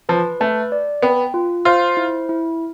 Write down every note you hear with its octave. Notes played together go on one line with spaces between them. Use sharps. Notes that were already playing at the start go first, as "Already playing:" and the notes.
F3 B4
A3 B4
D5
B3 G5
F4
F4 C5
E4
E4